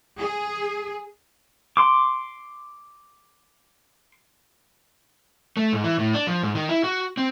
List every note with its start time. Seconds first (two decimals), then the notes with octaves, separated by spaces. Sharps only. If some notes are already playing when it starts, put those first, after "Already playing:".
0.19 G#4
1.77 C6 D6
5.57 A3
5.73 G#2
5.84 E3
5.99 A2
6.14 D4
6.27 F3
6.43 G#2
6.55 D#3
6.69 E4
6.84 F#4
7.17 C4